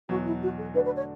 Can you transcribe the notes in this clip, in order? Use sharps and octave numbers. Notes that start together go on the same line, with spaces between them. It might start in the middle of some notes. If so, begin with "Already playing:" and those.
E2 B2 F#3 F#4
E4
F#4
A4
D3 A3 D4 F#4 B4
B4
C#5